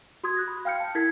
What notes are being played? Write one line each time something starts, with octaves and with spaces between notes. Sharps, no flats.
F#4 C6 D#6 G#6
F#6 A#6
B5
F5 G5 F6 G6 C#7
A5
E4 A#4 G#6 B6 C7